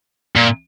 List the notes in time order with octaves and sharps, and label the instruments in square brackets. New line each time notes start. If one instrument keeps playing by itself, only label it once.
[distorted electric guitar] A#2